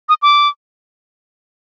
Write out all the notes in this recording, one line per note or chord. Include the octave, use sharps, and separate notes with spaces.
D#6
D6